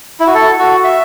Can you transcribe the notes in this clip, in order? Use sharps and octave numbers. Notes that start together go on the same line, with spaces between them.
E4
F#4
A4
F#4
E5